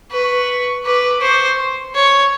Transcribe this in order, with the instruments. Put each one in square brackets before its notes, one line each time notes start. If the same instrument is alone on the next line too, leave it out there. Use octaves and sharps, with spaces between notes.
[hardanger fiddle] B4 [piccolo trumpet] C#6
[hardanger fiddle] B4 [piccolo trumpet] D6
[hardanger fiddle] C5 [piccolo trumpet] C#6
[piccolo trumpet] C6
[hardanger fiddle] C#5 [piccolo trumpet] C#6